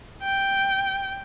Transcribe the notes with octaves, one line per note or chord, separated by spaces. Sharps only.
G5